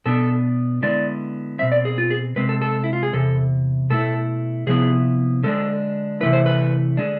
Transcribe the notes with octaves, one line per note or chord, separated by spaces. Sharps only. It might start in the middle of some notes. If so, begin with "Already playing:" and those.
B2 B3 D4 A4
D3 G#3 B3 E4 D5
B2 G#3 C4 E5
D5
G#4
F4
G#4
C3 G#3 C4 B4
A4
A4
E4
F4
G#4
E2 C3 A4
B2 A3 E4 A4
C3 F3 B3 E4 G#4
D3 G#3 D4 A4
C3 E3 A3 E4 B4
C5
B4
D3 G#3 D4